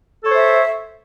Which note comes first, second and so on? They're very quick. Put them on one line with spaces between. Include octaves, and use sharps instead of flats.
A4 C#5 C5 E5